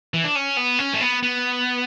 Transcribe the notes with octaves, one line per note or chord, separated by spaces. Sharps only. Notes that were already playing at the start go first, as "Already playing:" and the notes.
E3
D4
C#4
B3
C#4
A3
B3
B3